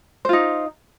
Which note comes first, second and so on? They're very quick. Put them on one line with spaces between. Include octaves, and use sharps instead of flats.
C5 F4 D#4